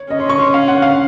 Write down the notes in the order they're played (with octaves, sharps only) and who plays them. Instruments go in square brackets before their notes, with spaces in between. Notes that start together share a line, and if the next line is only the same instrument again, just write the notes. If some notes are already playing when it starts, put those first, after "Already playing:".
Already playing: [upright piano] C#5
[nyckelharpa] C#4 [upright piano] D#5
[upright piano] C6
C#6
C6
F5
F#5
F5